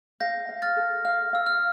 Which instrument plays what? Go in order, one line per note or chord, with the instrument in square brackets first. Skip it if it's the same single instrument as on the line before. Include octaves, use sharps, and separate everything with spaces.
[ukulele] F5 [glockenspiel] G6 A#6
[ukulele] F5
[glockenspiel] F6 A6
[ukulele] A4
[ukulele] F5 [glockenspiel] F6
[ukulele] F5 [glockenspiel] E6
[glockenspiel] F6